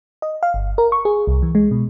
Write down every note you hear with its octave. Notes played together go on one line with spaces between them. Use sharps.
D#5
F5
G1
A#4
C#6
G#4
C2
E3
G#3
B2